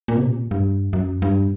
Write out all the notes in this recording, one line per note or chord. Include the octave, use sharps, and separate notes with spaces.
A#2
C3
A#2
G2
F#2
G2